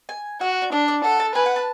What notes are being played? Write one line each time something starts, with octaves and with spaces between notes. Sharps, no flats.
G#5
F#4 F#5
D5
D4 D5
D5
A4 F#5
A5
B4 G#5
F#5
A5